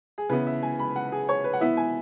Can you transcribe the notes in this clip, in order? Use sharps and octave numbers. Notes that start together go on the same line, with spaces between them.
G#4
C#3 E3 B3 E4 B4
E5
G#5
B5
F#5
G#4
C#5
B4
F#5
E3 B3 E4 E5
G#5